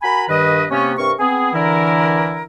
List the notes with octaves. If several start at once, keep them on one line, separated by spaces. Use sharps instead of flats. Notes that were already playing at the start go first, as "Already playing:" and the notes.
F#4 A#4 G#5 A#5 B5
G2 D#3 B4 D#5
C3 A#3 B3 C#4
G2 C3 C4 A#4 C#6
B3 C4 G#4
D3 E3 E4 A#4